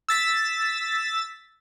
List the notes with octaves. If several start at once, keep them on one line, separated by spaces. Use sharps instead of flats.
E6 A6 B6